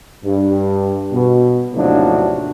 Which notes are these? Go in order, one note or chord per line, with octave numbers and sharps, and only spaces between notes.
G2
B2
D#2 A2 C3 F3 F#3 D4